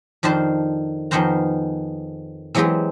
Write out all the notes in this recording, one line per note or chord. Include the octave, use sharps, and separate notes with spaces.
F2 D#3 D4 C5 A5
F2 D#3 B3 C#4 C5 A#5
E3 F#3 G#3 C4 G4 G#4